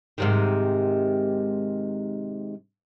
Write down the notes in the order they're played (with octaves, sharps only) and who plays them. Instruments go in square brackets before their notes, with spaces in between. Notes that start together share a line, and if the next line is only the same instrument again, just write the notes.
[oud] G#2 C3 D#3